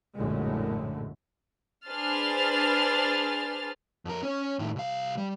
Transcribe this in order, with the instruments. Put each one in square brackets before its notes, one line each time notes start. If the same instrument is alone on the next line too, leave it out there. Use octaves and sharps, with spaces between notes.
[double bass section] A#1 F#2 A2 D3 G#3 A3
[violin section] D4 G#4 B4 C5 F6 A6
[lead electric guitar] F2 A#4
C#4 C#5
A2 D#3
C2 F5
G3